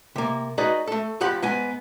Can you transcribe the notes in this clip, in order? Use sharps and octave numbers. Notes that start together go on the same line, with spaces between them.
C3 A#3
D#4 F#4 G#4 B4 D5 D#5
A3 A4
F2 F3 G4 F#5 B5
G#2 B3 G#5